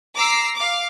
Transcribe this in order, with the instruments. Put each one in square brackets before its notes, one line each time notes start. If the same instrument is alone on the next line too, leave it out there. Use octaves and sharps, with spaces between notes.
[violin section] A#5 D6 E6 C7
F5 D6